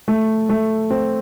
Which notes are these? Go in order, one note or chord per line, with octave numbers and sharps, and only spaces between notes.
A3
A3
C4